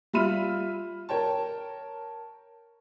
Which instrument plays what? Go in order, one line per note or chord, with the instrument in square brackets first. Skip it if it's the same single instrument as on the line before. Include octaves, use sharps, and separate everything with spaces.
[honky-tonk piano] G3 F4 E5 B5 F6 D#7
A#4 C#5 G5 A5